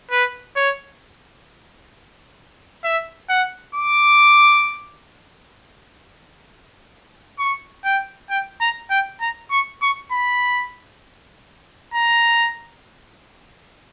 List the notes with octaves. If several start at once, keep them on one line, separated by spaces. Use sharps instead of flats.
B4
C#5
E5
F#5
D6
C#6
G5
G5
A#5
G5
A#5
C#6
C#6
B5
A#5